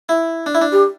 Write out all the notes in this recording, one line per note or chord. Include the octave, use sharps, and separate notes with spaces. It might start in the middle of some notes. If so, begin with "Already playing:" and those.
E4
D4
E4
D4
G4